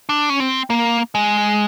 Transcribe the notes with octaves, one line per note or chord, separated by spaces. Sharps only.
D4
C#4
C4
A#3
G#3